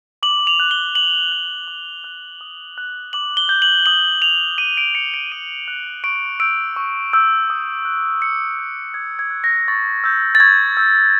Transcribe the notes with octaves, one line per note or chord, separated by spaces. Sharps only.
D6 F#7
F7
F#6
G7
D6 F#7
F#6
D6
F#6
D#6
F#6
D6 F#7
G7
G6
F#7
D#6 F#7
G6 F7
D#6 D#7
D7
G6 C#7
D7
D#6 D#7
F#6
C#6 D7
E6 G6 D7
C#6
E6 G6
D#6
F#6
D6 C#7
G6
D#6 G#6
G#6
F#6
A#6
C#6 A6
E6 G6
A6
C#6 G#6
E6 G6